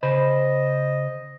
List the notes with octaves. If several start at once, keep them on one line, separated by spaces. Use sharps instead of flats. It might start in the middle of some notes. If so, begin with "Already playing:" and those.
C#3 C5 D#5 B5